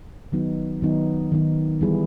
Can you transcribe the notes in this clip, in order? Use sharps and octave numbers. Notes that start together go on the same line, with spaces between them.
D#3 F#3 B3 D#4
D#3 F#3 B3 D#4
D#3 F#3 B3 D#4
E3 G3 B3 E4 G#4